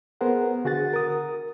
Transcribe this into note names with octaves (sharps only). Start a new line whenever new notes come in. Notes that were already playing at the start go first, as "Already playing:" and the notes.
B3 G#4 A#4 C5 F#5
D3 F#4 G#4 F#5 A6
A#4 D#6